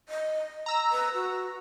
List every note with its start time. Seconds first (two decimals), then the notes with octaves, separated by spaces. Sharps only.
0.09 D#5
0.66 A#5 E6 A#6
0.92 B4
1.15 F#4